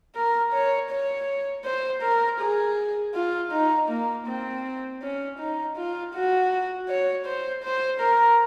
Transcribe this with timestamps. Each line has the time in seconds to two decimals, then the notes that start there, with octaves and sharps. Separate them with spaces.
0.16 A#4
0.53 C#5
0.91 C#5
1.65 C5
2.03 A#4
2.40 G#4
3.15 F4
3.52 D#4
3.89 A#3
4.27 C4
5.02 C#4
5.39 D#4
5.77 F4
6.14 F#4
6.89 C#5
7.26 C5
7.64 C5
8.01 A#4